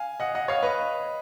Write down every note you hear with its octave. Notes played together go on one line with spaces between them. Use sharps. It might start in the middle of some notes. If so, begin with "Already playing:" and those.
Already playing: F5 G#5
D#5 F#5
D#5 F#5
C#5 F5
B4 D#5